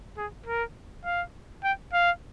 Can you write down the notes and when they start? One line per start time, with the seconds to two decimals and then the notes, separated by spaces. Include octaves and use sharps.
0.18 G#4
0.46 A#4
1.05 F5
1.64 G5
1.93 F5